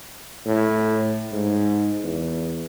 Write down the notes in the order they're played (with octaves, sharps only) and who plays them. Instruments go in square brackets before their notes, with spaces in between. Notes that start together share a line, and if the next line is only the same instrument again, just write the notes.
[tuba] A2
G#2
E2